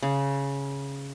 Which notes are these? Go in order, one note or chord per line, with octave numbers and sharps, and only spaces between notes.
C#3